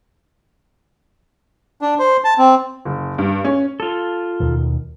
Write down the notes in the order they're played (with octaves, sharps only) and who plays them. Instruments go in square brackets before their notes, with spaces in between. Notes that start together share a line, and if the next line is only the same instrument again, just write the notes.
[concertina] D4
C5
A5
C4
[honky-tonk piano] F#1
G2
C#4
[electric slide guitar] F4 A4
[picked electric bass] D#2 B2 D#3